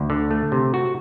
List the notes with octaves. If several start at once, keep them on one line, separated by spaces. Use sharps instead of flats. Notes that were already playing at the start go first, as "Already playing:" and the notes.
Already playing: D2
D3
A3
C3
F#4